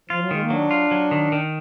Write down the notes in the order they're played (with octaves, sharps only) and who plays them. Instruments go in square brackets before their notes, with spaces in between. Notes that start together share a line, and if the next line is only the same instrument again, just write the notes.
[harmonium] F3 [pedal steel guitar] F4
[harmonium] F#3
[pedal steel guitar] D#3 [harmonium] G#3
[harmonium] A#3
[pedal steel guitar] F#3 [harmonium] D4
[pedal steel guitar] F4
F#3
D#3
D#3